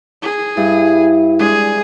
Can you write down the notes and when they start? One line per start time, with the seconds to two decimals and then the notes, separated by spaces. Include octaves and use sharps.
0.23 G#4
0.57 G2 E4
1.39 G#3 D4 G#4